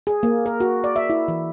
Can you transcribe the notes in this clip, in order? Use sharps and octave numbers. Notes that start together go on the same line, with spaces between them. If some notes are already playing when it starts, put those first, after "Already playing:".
G#4
A#3
A#4
F#4
D5
E5
E4
E3